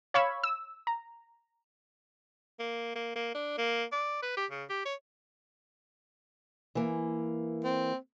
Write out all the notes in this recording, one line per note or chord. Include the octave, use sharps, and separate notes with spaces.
C#5 F5 B5 C#6 E6 G#6
E6
A#5
A#3
A#3
A#3
D4
A#3
D5
B4
G4
C#3
G4
C#5
E3 A#3
C4